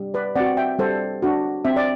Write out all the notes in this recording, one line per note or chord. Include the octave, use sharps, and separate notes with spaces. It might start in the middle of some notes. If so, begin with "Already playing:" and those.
Already playing: G3
B4 D5
C4 F#4 D5 F#5
E5 G5
G3 A4 C5
D4 F#4
C4 E5
D5